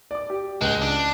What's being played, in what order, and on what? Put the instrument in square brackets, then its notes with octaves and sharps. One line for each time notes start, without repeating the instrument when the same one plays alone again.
[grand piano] D5 D6
G4
[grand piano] C#2 F#6 G7 [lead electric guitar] G#3
[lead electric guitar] D4